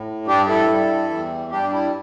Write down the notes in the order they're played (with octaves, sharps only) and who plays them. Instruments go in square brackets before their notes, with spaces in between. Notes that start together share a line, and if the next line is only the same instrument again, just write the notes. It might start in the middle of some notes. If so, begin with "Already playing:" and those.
Already playing: [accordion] A2
G2 G3 D4 G4
E4 A4
G2 G3
E2 E3 G3
G3 D4 G4
G2
D4
E4